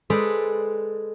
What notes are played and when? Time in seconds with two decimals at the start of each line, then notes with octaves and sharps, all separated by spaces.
0.10 G#3 G#4 A4 B4 C5 D5